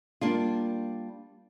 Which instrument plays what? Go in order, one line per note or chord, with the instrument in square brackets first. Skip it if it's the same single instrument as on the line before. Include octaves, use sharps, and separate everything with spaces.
[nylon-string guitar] G3 A#3 D4 F4